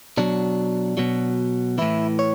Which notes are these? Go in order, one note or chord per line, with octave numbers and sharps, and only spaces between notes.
B2 F#3 D4
B2 F#3
A2 E3 E4
C#5